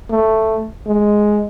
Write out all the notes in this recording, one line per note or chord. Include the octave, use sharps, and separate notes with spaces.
A3
G#3